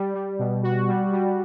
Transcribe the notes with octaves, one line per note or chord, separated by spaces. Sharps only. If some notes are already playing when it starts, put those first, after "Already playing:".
Already playing: G3
G3
B2
F#4
G3
G3